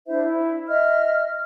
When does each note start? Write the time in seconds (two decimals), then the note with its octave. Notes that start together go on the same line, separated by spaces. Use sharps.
0.07 D4 E4 C5 E5
0.24 E4
0.67 D#5 E5 F6